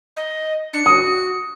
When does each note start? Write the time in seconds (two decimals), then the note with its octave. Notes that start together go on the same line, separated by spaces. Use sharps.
0.17 D#5
0.73 D4 C#7
0.86 F#4 D#6